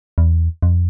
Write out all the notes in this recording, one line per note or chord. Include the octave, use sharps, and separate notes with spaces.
E2
F2